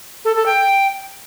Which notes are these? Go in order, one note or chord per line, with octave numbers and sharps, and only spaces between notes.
A4
A4
G5